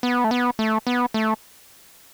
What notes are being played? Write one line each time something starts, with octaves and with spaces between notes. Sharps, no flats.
B3
A3
B3
A3
B3
A3